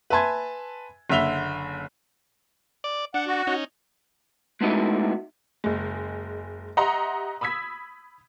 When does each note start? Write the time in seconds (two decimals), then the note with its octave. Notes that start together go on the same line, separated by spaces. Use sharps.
0.10 B4 E5 G#5 A5 C6 G#6
1.10 F#1 D3 E5 F7 G7
2.84 D5
3.14 D4 F#5
3.27 F#4
3.47 C#4 D#4
4.61 G#3 A3 B3 D#4 E4 F#4
5.64 F#1 G#3
6.77 G4 D#5 E5 F#5 A#5 C6
7.41 B5 D#6 E6 G#6 B6